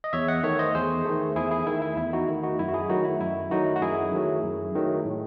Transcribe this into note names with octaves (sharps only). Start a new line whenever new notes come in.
D#5
E2 C#5 E5
D#5 F#5
D#3 A3 C#5 E5
C5 D#5
E2 G#4 C5
D#3 A3
E2 E4 G#4
E4 G#4
D#3 A3 E4
E4
E2 E4
D#4 F#4
D#3 A3
D#4 F#4
F#2 E4
F#4
E4 G#4
D#3 F#3 A3 D#4 F#4
E4
F#2 E4
D#3 F#3 A3 D#4 F#4
F#4
F#2 E4 G#4
D#3 F#3 A3
F#2
D#3 F#3 A3
A2